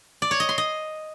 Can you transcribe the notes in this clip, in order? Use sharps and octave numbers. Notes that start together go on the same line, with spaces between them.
D5
C#5
D#5
C6
D#5